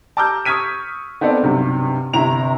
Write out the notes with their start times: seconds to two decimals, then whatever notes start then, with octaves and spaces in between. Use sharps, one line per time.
0.17 A5 A#5 D6 E6 F6 G6
0.45 C#6 D#6 F6 G#6 B6 D#7
1.21 B3 C4 D#4 A4 D5
1.43 B1 G2 C3
2.13 G1 C3 E4 A#5 F7